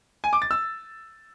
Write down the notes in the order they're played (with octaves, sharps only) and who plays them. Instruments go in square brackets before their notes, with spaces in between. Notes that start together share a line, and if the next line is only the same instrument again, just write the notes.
[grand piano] G#5
D6
A6
E6